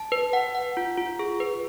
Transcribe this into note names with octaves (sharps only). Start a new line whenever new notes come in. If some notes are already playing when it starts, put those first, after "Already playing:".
Already playing: A5
B4
F#5
F#5
F4
F4
G#4
B4